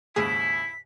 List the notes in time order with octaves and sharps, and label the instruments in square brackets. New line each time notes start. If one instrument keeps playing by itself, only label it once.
[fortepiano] D#2 G#2 C#3 [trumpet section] E4 [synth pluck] G#4 [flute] B6